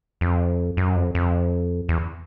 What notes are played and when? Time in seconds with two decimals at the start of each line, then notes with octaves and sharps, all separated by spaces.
0.21 F2
0.77 F#2
0.96 F2
1.15 F2
1.89 E2